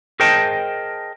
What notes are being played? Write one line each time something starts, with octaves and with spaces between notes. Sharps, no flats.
G#4 A#4 C5 D#5 G5 A5